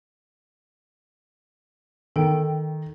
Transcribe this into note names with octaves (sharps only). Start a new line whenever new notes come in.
D#3 A4 G5